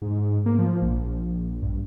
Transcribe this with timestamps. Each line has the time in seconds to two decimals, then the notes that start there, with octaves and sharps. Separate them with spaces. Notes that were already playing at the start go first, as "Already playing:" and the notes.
0.02 G#2
0.46 A#3
0.59 F3
0.82 A#1
1.62 G2